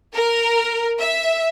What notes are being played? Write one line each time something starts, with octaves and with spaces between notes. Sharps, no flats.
A#4
E5